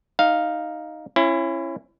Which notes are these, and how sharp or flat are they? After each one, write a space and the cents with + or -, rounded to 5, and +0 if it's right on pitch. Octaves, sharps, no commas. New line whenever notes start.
D#4 +0 F5 +0
C#4 -25 E4 +25